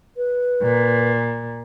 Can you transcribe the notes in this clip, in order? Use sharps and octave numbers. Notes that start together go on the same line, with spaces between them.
B4
A#2